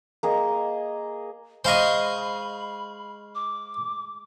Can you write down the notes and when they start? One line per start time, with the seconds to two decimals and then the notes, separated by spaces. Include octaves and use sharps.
0.23 A#3 G#4 D#5
1.65 G#3 C5 D#5 F5 B5 C#6
3.35 D6